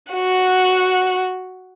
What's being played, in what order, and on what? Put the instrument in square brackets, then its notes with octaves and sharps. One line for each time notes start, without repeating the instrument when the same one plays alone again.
[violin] F#4 F#5